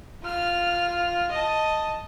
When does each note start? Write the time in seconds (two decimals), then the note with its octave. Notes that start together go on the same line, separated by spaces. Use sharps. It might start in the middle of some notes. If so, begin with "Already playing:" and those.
0.23 F4 F6
1.31 D#5 A5